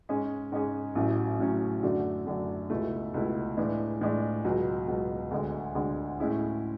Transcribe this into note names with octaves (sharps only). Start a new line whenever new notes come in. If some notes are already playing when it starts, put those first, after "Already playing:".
G#2 G#3 C#4 G#4
G#2 G#3 C#4 G#4
A1 A2 F#3 C#4
A1 A2 F#3 C#4
F#2 D3 A3 D4 F#4
F#2 D3 A3 D4 F#4
C#2 B2 A3 E4
C#2 B2 A3 E4
A2 E3 G#3 D4
A2 E3 G#3 D4
C#2 B2 F#3
C#2 B2 F#3
D2 D3 G#3
D2 D3 G#3
A2 G#3 C#4 E4 G#4